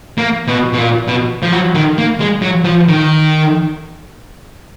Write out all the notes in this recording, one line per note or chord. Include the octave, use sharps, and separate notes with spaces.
A#3
B2
B2
A#2
B2
F3
F#3
D#3
A#3
G#3
F#3
F3
D#3